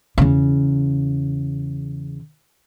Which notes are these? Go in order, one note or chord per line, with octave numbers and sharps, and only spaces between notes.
E2 C#3